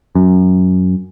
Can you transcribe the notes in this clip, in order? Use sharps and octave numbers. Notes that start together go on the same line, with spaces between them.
F#2